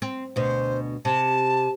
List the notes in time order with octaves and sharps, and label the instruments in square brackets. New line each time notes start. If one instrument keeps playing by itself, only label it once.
[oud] C4
[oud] D2 B2 [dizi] C5
[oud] C3 [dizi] A5